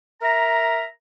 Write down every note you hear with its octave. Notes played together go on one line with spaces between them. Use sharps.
A#4 E5 A#5